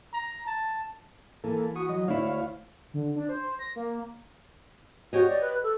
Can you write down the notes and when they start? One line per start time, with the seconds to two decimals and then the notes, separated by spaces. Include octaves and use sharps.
0.13 A#5
0.47 A5
1.44 E3 A#3 A4
1.76 F#4 C#6 D#6
1.89 F#3 D#5
2.08 D2 E4 C#5 F5
2.94 D3
3.16 D4
3.29 C5
3.42 C5
3.59 A#6
3.76 A#3
5.13 F#4 G4 C#5 D#5
5.28 D5
5.41 B4
5.63 A4